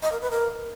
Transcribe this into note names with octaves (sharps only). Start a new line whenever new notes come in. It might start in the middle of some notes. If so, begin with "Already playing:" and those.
D#5
A#4
B4
A#4